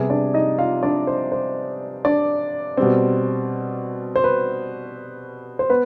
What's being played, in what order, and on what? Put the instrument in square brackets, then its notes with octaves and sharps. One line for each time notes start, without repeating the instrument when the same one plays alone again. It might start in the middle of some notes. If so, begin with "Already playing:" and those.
Already playing: [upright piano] C3 G3 B3 G#4 G#5
D4 D5
D#4 D#5
F4 F5
D4 D5
C5
C5
D4 D5
B2 G3 C4
C5
B4
C5
B3 B4